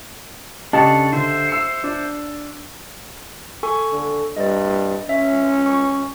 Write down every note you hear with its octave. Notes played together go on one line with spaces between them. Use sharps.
C#3 D4 G4 A4 C#5 D#5 A5
D3 C5 E5
E6 C7 C#7
D4
A4 G#5 C#6
D3
G2 D5 D#5
C#4 E5
C#6